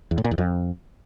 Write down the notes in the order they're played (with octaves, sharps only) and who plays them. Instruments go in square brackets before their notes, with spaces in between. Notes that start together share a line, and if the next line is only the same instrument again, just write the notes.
[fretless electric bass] E2
A2
A#2
E2
F2